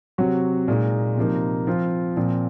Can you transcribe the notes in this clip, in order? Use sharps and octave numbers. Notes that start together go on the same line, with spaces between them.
C3 F#3 C4 F#4
A#2 G#3 D#4
C3 F3 A#3 D#4
F3 C4 F4
A#2 F3 C4